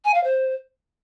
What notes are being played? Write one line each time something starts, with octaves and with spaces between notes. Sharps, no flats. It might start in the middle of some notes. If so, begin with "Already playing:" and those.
G#5
F5
C5